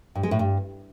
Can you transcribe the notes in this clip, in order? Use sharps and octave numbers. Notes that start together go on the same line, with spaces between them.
G2
G#3
A2
G2